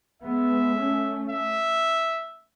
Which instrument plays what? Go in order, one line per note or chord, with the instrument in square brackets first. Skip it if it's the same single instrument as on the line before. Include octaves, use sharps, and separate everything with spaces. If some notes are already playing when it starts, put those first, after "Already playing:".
[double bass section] G#3 B3 [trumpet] E5
[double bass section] A3 C#4
[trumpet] E5